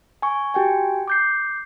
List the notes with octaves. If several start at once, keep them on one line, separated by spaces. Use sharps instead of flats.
G#5 C#6
F#4 G4 G5 G#5
D6 G6 C7